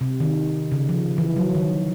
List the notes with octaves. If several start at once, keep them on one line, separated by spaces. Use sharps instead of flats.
C3
D#3
C#3
F3
E3
F#3
D#3